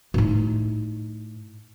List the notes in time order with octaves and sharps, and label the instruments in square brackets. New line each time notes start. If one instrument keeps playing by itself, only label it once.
[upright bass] A2 D#4